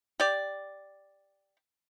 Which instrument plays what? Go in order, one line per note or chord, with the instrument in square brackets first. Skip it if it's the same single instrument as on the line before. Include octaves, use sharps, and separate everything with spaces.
[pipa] G4 D5